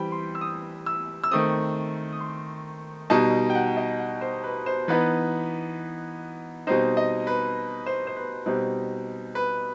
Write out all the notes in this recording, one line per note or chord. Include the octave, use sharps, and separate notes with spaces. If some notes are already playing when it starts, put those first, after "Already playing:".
Already playing: E3 G3 C4 G5 B5
C6
E6
D#6
E6
E6
D#3 A3 C4 D#6
D#6
C6
B2 G3 D#4 A5
G5
F#5
D#5
F#5
C5
B4
C5
E3 B3 D#4 B4
B2 G3 C4 D#4 C5
D#5
B4
C5
C5
B4
B2 G3 C4 D#4
B4